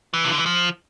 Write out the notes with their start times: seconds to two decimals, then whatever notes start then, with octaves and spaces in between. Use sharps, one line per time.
0.14 E3
0.24 C3
0.31 D3
0.38 E3
0.46 F3